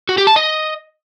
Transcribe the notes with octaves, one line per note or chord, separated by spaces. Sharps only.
F#4
G4
A5
D#5